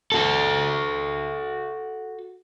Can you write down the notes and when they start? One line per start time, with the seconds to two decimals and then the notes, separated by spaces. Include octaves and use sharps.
0.12 F#4 A4